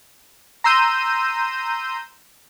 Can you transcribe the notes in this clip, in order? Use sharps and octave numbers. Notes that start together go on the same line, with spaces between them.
A#5 C6 E6 G6 D#7